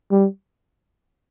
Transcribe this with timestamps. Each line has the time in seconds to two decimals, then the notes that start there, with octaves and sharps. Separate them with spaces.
0.11 G3